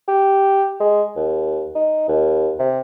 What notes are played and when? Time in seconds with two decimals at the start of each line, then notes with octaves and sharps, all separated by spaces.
0.08 G4
0.80 G#3
1.16 D#2
1.75 D#4
2.08 D#2
2.59 C3